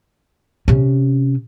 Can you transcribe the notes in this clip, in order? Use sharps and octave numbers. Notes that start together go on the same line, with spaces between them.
C3 C#4